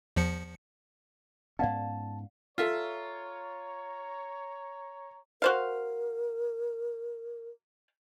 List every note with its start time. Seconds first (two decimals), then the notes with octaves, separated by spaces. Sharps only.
0.16 E2 F3 C#7
1.59 G#2 B3 C#4 D5 F5 F#5 A5
2.58 F4 A4 C#5 E5 F5 A#5
5.42 F#4 A#4 C5 F5